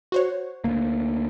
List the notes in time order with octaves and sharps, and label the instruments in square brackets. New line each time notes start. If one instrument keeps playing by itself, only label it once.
[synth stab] F#4 C5 C#5
[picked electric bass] D2 A#3